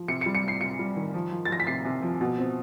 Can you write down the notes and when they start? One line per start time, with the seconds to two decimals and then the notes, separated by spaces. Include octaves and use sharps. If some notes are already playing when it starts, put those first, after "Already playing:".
Already playing: F3
0.08 C3 C#7
0.21 C#7
0.26 G3
0.35 C#7
0.44 C3 C7
0.61 C3 C#7
0.79 G3
0.97 D#3
1.14 F3
1.32 F3
1.45 A6
1.49 F3 A#6
1.60 B6
1.67 C3 C7
1.85 C3
2.02 F3
2.21 B2
2.38 C4